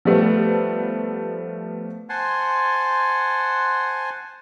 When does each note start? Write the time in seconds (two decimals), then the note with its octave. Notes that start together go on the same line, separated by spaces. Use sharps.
0.05 F3 G3 A3 B3
2.09 C5 F#5 G#5 A5 C6